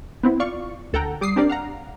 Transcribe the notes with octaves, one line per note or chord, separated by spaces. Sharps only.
B3 C4 E4
F4 D5 F5 C#6
D2 A4 F#5 G5 A#5
G3 D6 D#6 C7
C4 D4 G4 A#4 D5
F5 F#5 A#5